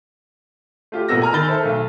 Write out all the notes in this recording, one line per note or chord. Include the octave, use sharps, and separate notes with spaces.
A3 F4 G4
E1 A#2 A3 B3 E6 A#6
G#5 A#5 F6
D#3 B5 A6 G7
A4 A#4 C5 E5 A5
B1 A3